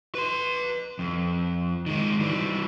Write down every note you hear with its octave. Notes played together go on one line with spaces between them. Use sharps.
B4 C6
F2
D#3 G#3
E3 G3